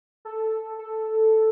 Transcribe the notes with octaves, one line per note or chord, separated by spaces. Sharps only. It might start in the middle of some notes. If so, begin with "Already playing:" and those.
A4
A4